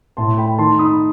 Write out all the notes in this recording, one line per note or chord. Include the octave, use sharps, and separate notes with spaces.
A2 A5 C6
A3 G5 B5
D#3 A5 C6
D#4 B5 D#6